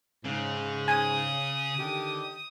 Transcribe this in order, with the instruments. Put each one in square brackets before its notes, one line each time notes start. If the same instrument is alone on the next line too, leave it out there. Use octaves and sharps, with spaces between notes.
[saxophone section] G#2 [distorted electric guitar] C#3
[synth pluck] G#5 [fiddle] D#6
[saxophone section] D3 D#3 G4